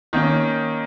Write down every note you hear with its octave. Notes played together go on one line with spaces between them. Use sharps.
D#3 A#3 C#4